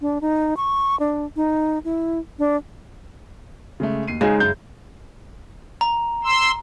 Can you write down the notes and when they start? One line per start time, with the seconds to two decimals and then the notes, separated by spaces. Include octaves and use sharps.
0.01 D4
0.21 D#4
0.57 C#6
0.99 D4
1.36 D#4
1.84 E4
2.39 D4
3.80 C#3 G#3 A3
4.08 D#2 C7 D#7
4.21 C#3 G#3 D#4 G#4 G#5
4.40 F#2 G6
5.81 A#5
6.24 C6 E6